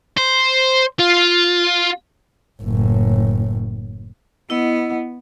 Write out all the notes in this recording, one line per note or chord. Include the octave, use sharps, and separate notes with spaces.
C5
F4
F#1 A2
B3 E4 D#5 F#5